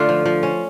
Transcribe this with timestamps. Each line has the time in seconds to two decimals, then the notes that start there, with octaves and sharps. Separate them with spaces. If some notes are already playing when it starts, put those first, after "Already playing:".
Already playing: D3 A3 D4 F4
0.09 F3
0.26 F3
0.43 C#4